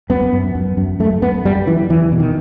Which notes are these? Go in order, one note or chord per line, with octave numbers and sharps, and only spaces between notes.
F#2 B3
F#2
F#2
F#2
F#2 A3
F#2 B3
F#2 G3
F#2 E3
E2 E3
B2
D#3